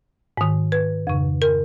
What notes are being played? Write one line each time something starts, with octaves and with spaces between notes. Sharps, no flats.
G#2 D#3
B4
F2 C#3
A#4